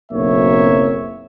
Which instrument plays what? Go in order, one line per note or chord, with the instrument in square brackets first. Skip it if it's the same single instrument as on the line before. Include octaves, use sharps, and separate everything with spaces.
[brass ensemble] F#1 B1 A#3 C4 C#5 E5